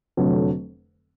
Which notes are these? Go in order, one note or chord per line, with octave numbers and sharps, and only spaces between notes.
F1 F2 D3 F#3 A3